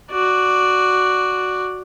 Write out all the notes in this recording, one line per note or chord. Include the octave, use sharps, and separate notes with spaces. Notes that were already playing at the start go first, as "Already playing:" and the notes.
F#4 D5